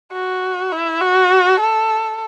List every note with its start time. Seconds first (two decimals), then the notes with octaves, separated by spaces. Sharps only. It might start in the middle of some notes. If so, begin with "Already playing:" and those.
0.12 F#4
0.71 E4
1.01 F#4
1.60 A4